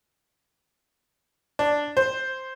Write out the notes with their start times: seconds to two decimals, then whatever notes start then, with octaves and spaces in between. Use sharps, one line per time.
1.59 D4
1.97 C5